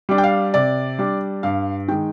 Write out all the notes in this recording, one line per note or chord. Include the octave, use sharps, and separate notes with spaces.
G3 D4
G5
F5
C3 D5
G3 D4
G2 F5
D#3 G#3 G5